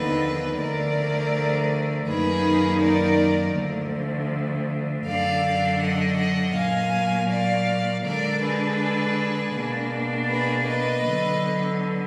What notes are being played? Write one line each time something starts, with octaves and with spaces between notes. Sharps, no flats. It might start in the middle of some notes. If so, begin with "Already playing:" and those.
Already playing: D#2 D3 F3 B3 D#4 B4 D#5
D2 D3 F3 A#4 D5
F#2 D#3 A#3 D#4 G#4 B4
A#4 D5
D2 D3 F3
F#2 D3 F#3 D4 D5 F5
D#5 F#5
D#5 F#5
A#2 F#3 A#3 F5 G#5
D5 F5
D3 G#3 D4 A#4 D5
G#4 B4
B2 A#3 D4
G#4 B4
B4 D#5
D3 F#3 B3